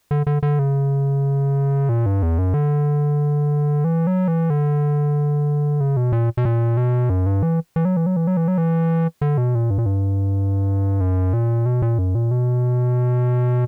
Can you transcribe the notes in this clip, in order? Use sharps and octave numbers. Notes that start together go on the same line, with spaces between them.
D3
D3
D3
C#3
A#2
G2
E2
F#2
D3
E3
F#3
E3
D3
C#3
B2
A#2
B2
A#2
B2
F#2
G2
E3
E3
F#3
E3
F#3
E3
F#3
E3
F#3
E3
D3
B2
A#2
G2
A#2
G2
F#2
A#2
B2
A#2
F#2
A#2
B2